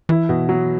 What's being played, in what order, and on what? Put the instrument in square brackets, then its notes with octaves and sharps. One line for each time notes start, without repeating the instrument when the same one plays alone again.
[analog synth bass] E3 [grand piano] E4
[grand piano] B2
F#3